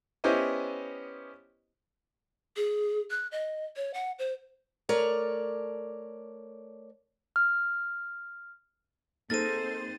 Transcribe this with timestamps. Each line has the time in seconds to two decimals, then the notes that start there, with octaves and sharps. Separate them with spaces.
0.24 B3 C#4 E4 G4 C5 D#5
2.56 G#4
3.10 F#6
3.32 D#5
3.76 C#5
3.94 F#5
4.19 C5
4.89 A3 A#4 C#5 D5
7.36 F6
9.30 A#3 C4 D#4 G#4 A4 C5 A6 D#7